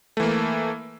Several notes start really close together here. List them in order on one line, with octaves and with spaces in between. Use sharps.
A3 E3 A#3